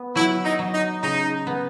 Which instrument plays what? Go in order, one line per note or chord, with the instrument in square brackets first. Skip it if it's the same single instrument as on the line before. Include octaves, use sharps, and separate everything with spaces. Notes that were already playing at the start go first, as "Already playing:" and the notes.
Already playing: [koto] B3
[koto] F#3 [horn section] E4
[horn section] D#4
[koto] F#3
[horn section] D#4
[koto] C#3 [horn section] D#4
[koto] B3